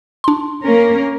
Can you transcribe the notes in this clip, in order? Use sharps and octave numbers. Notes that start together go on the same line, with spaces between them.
D4 C6
A#3 C#4 A#4